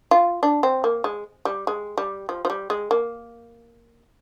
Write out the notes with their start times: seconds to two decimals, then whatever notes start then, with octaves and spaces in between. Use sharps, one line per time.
0.11 F4
0.43 D4
0.63 C4
0.84 A#3
1.04 G#3
1.45 G3
1.67 G#3
1.97 G3
2.29 F3
2.45 F3
2.50 G3
2.70 G#3
2.91 A#3